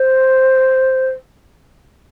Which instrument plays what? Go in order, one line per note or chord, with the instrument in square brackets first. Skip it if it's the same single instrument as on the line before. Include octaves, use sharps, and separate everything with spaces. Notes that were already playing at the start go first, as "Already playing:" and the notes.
Already playing: [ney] C5